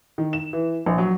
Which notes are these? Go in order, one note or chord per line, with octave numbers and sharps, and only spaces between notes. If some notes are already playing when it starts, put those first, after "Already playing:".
D#3
E7
E3
A#1
F#3